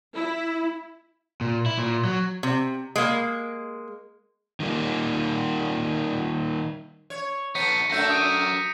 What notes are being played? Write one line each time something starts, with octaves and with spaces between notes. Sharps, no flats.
E4
A#2
E4
A#2
F#3
C3
G#3 A#3
D#3 G3 A#3
C#5
B3 D#4 A4 B6 C#7 D#7
F#2 F#3 A3 D4 E5 G6 A#6
D#6 D7 D#7